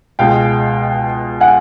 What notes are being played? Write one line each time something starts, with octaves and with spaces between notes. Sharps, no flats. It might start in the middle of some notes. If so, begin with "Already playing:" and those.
C#2 B2 G#3 F5 G5
F#5 G#5